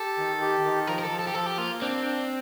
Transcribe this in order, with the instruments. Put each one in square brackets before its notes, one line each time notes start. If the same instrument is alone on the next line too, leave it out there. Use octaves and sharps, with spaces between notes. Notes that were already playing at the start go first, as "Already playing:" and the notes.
Already playing: [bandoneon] G4 [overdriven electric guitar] A4
[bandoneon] D#3
G4
D#3
[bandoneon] F3 [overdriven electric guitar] A#4
[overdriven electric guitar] A#4
A4
[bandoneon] F3
[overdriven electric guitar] A4
G4
[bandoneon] F3 [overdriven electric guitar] A4
[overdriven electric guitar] G4
[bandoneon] A#3 [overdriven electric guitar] F4
[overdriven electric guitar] C4 [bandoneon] D4
[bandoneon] D4